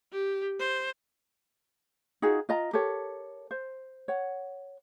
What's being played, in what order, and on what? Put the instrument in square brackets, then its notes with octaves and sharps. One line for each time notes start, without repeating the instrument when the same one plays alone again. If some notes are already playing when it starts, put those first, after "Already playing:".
[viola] G4
C5
[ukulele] D#4 F4 F#4 G#4
F4 D#5 A#5
G4 A4 A#4 C#5
C5
C#5 F#5